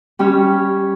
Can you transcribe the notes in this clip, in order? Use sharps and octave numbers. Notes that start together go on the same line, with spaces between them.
G3 C#4 G4 C#5